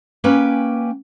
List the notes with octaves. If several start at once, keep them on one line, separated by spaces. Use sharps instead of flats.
A#3 C#4 B4 G5 G#5